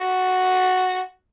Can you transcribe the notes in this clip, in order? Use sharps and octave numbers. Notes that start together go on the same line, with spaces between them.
F#4